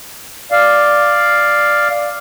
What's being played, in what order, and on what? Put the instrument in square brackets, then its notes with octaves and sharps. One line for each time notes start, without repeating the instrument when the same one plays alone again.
[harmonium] D5 F5